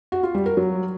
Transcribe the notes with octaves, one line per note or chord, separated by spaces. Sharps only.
F#4
F4
G3
A#4
F#3